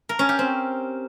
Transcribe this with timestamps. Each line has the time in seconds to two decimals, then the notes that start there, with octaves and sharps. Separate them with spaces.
0.09 A#4
0.19 C#4
0.29 G4
0.39 C4